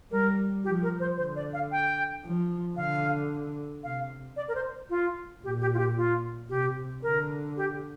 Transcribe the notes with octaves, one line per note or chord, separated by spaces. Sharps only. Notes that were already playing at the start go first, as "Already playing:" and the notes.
G3 A#4
F3 G4
A#4
C5
D3 C5
D5
F5
G5
F3
D3 F5
C3 F5
D5
A#4
C5
F4
A#2 G4
G4
F4
G4
F4
C3 G4
D3 A#4
G4